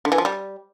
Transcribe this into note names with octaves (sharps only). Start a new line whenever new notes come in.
D3
E3
F3
G3